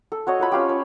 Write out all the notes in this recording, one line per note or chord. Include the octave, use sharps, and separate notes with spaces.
A4
F#4 C#5 D#5
F4 B4 B5
C#4 F4 G4
C#5